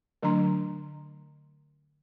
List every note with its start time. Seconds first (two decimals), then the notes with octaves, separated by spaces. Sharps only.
0.23 D3 F#3 A3 D4 A#5 C6